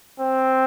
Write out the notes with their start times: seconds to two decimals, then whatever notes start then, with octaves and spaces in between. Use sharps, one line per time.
0.20 C4